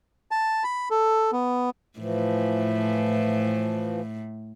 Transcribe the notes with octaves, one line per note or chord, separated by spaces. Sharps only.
A5
B5
A4
B3
A2 E3 F3